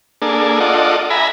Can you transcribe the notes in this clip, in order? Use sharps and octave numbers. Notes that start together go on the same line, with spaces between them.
A#3 D4 G#4 A4
F4 A4 D5 D#5 F#5
E5 G#5 A#5 B5